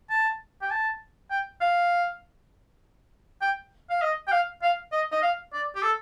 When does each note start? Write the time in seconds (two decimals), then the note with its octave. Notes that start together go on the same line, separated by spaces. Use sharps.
0.10 A5
0.62 G5
0.70 A5
1.30 G5
1.61 F5
3.42 G5
3.90 F5
4.01 D#5
4.27 G5
4.32 F5
4.62 F5
4.92 D#5
5.12 D#5
5.22 F5
5.53 D5
5.75 G4
5.82 A4